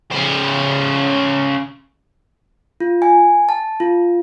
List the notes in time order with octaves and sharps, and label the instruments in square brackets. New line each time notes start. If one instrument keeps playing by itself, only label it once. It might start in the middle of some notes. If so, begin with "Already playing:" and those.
[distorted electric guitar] C#3 C5
[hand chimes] F4
G#5
A5
F4